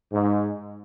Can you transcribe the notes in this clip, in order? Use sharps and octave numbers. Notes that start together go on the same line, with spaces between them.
G#2